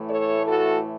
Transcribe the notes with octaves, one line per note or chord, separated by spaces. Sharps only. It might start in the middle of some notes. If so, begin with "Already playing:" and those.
Already playing: A2 E3 A3
A4 C#5
F#4 A4